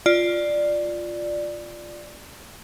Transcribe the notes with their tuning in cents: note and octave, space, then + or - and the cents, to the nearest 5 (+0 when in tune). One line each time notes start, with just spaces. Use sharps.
F4 +0 D5 +10